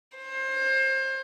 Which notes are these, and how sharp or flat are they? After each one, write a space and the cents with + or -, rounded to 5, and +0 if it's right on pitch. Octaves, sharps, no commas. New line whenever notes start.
C5 +30